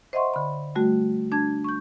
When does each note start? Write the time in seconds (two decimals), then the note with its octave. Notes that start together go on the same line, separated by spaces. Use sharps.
0.13 C5 D#5 E5 F#5 C6 C#6
0.34 D3 B5
0.75 G3 A3 F#4
1.32 D4 A5 G#6
1.64 C#6 G6